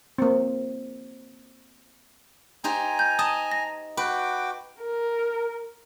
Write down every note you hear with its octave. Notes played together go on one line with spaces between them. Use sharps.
A#3 C4
D#4 G4 C5 G#5 A#5
G6
D#5 A5 D#6
A#6
F#4 B4 G5 D6
A#4